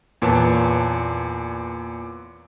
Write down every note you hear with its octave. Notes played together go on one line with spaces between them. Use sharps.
E2 A#2 B4 C#5 A5